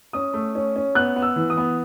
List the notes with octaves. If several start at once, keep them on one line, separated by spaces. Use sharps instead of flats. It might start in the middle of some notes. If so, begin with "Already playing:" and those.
C#4 D#6
A3
C#4
C#4
B3 F#6
B3
E6
E3
D#6
B3